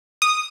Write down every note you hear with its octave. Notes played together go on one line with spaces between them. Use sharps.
D#6